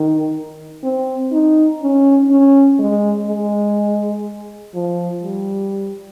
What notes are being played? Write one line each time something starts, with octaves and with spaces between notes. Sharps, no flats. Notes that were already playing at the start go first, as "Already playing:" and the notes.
Already playing: D#3
C4
D#4
C#4
C#4
G#3
G#3
F3
G3